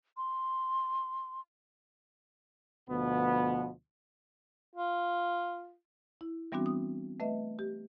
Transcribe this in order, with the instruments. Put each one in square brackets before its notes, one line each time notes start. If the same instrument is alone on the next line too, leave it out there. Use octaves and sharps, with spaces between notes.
[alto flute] C6
[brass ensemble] D2 B2 F3 B3
[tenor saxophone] F4
[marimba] E4
E3 G3 B3 C4 D4 F#4
D#6
A3 B4 D#5 E5
G4